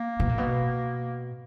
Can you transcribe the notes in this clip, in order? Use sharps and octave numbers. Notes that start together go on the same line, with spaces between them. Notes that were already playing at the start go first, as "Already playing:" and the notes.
Already playing: A#3
B2
A#2
B2